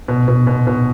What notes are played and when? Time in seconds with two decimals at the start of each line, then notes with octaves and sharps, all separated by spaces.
0.08 B2
0.28 B2
0.47 B2
0.67 B2